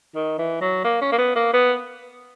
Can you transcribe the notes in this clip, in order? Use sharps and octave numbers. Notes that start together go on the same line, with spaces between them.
D#3
E3
F#3
A#3
C#4
A#3
B3
A#3
B3